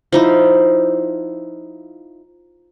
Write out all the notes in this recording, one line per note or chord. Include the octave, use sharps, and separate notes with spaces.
F3 D#4 E4